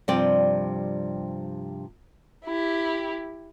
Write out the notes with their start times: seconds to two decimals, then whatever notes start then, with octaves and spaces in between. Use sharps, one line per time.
0.08 G2 C3 F3 G3 D5 G5
2.44 E4 G4